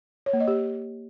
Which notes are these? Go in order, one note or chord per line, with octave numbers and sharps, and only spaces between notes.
C#5
A#3
D#5
G4